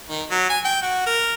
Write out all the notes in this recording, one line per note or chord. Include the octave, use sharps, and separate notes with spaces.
D#3
F#3
G#5
G5
F#4
A#4